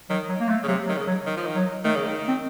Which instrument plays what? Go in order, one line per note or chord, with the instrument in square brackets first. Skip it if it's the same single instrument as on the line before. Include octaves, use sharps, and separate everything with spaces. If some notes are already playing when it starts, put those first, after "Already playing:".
[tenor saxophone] D#3 [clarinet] F#3
[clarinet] F#3
A#3
A3
[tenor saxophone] C#3
[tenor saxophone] C3 [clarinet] F#3
[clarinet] F#3
[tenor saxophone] D#3
C#3
[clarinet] F#3
[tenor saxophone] D#3
F3
D#3
[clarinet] F#3
[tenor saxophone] D#3 [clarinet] A3
[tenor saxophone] C#3
D#3
[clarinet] C4